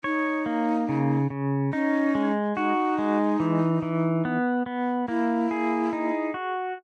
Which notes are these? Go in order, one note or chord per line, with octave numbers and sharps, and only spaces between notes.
D#4 C#5
A#3
C#3
C#3
C#4 D#4
G#3
D#4 F#4
G#3
E3
E3
B3
B3
A#3 E4
G#4
D#4
F#4